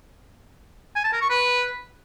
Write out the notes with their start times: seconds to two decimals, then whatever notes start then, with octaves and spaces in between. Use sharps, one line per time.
0.96 G#5
1.04 A5
1.13 A#4
1.21 C#6
1.30 B4